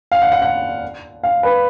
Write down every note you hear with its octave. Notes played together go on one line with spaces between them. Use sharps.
F5
F#5
F#5
F#5
F5
B4